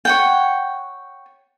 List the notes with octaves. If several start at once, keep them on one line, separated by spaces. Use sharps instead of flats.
C#5 F#5 G5